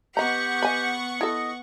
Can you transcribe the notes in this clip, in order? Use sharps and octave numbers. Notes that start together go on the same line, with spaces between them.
B3 G4 D#5 F#5 A#5 C#6
D#5 G#5 B5
E4 A4 D#5